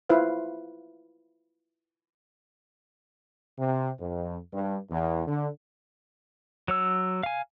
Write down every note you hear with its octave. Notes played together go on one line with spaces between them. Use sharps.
E4 F4 B4 C5 F5
C3
F2
G2
E2
D3
F#3 C#5 E6
F5 G#5